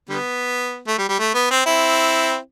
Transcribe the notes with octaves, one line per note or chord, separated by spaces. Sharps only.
D3 G3 B3
A3
G3
G3
A3
B3
C4
C4 E4